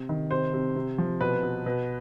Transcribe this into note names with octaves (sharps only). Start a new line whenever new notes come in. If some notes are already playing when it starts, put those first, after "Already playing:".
Already playing: C3
D#3
C3 C5
C3
C3
F3
B2 B4
B2
B2